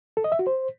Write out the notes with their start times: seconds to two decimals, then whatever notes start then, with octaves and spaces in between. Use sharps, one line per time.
0.17 A4
0.24 D#5
0.32 E5
0.39 F#4
0.47 C5